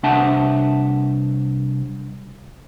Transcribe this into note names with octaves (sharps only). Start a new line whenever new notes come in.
C2 D4 E5 F#5 A5